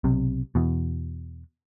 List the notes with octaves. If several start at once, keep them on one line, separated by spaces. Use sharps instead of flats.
B1 C3
E2 B2